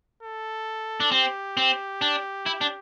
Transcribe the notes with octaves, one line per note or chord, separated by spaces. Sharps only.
A4
D4
C4 G4
C4
D4
E4
D4